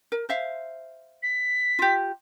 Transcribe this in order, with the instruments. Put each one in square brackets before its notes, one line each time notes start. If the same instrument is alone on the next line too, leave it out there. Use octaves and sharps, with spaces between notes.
[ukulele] A#4
C5 E5 F5
[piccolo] B6
[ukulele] F4 G4